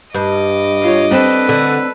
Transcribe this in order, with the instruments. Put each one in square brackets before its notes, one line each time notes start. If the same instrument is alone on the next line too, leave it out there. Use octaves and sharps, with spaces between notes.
[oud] G2 [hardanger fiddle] D#5 D6
[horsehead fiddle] F4 C#5
[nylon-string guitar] C4 D4 [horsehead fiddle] A4 B4
[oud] D3